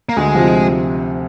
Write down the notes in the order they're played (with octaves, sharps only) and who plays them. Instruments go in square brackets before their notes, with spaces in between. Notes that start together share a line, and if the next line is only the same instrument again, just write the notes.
[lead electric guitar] A#3
[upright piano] D2 [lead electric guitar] G#3
[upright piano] C3 F3